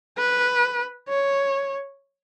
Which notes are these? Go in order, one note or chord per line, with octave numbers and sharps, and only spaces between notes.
B4
C#5